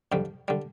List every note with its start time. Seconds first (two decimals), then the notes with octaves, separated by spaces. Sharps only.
0.12 F2 D3 G3
0.48 D3 G3